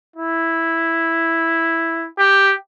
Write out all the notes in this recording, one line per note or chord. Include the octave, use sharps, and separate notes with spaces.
E4
G4